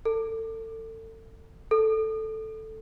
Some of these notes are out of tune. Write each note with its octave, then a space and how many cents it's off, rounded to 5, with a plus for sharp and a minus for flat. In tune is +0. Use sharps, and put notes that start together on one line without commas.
A4 +30
A4 +0